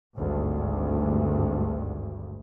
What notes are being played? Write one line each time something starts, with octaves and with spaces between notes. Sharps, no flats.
G#1 D2 G2